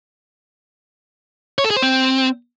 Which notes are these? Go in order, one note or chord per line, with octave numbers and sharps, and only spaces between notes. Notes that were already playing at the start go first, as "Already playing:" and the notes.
C#5
A4
G#4
C5
C4